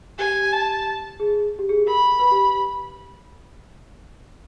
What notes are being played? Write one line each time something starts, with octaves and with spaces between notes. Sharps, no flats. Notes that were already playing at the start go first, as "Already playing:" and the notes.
G4 G#5
A5
G#4
G4
G#4
A#4 B5
B4
G4